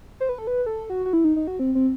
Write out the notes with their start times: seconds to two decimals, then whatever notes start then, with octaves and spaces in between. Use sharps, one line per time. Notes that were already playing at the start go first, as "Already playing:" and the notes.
0.20 C5
0.29 B4
0.38 A4
0.47 B4
0.66 A4
0.90 F#4
1.06 F#4
1.13 E4
1.24 D#4
1.36 D#4
1.47 F#4
1.59 C4
1.75 C4